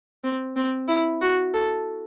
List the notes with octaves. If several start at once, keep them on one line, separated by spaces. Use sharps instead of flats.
C4
C4
E4
F#4
A4